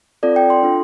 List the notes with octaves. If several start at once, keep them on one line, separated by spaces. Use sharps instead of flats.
C4 F4 A4 D5
G5
C6
D4 F4 A4